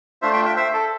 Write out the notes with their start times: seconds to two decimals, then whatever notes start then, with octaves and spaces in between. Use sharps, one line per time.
0.22 A3 D4 F4 C5 E5
0.33 E5 G5
0.45 E5 G5
0.56 C5 E5
0.73 A4